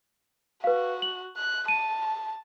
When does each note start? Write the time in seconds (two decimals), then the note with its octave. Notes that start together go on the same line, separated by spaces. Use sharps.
0.64 F#4 B4 F5
1.02 F#7
1.37 F#6
1.68 A5 D#7